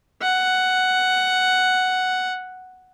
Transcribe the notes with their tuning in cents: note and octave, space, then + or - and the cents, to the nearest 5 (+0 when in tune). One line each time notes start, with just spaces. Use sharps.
F#5 +5